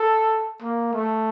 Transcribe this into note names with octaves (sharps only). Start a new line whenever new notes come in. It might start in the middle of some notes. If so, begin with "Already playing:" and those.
Already playing: A4
A#3
A3